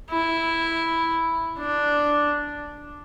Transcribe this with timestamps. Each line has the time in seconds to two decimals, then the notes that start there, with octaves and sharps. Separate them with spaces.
0.10 E4
1.59 D4